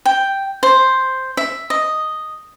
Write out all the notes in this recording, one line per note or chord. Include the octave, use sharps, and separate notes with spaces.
G5
C5
E5
D#5